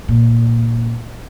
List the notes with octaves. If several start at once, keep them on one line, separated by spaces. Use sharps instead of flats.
A#2